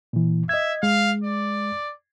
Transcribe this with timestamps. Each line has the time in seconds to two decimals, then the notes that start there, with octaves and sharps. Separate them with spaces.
0.13 A#2 E3
0.49 D#5 E5 G#6
0.83 G#3 F5
1.24 D5